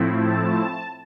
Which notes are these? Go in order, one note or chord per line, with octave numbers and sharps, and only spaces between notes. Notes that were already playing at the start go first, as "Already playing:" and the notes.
Already playing: A2 F3 A3 C4 E4
A5